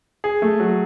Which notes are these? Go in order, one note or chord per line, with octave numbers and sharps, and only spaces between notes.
G#4
A3
F#3